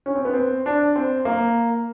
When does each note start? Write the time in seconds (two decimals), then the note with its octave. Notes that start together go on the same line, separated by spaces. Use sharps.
0.06 C#4
0.15 C4
0.25 B3
0.33 C4
0.66 D4
0.96 C4
1.25 A#3